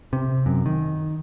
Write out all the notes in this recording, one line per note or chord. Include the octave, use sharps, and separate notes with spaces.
C3
F#2
D#3